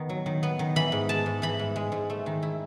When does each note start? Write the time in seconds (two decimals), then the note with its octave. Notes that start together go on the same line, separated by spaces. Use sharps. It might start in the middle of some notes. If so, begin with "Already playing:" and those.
Already playing: D#3 B3
0.09 F#3
0.26 D#3
0.43 B3
0.59 D#3
0.76 E3 B5
0.92 G#2
1.09 G#3 A5
1.26 G#2
1.42 E3 B5
1.59 G#2
1.76 G#3
1.92 G#2
2.10 A3
2.26 D#3
2.43 E4